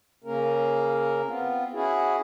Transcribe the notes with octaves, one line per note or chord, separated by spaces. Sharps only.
C#3 A#3 C#4 A#4
B3 C4 F4
C#4 E4 F#4 G#4